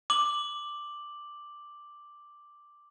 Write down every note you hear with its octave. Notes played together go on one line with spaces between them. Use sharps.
D6 F#7